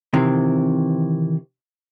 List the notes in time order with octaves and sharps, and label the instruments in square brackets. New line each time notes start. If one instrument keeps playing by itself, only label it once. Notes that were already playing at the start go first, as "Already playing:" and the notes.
[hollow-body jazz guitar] C3 D#3 E3 C4